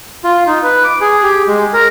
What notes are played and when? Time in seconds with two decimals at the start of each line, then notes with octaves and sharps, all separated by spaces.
0.24 F4
0.47 D#4
0.63 B4
0.84 D6
1.01 G#4
1.23 G4
1.48 G#3
1.73 A#4